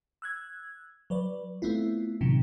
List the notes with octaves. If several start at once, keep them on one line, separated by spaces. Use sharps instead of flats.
E6 F#6 G#6
F#3 B4 D5
A3 B3 C4 E4 F4
A2 C3 D#3 F#3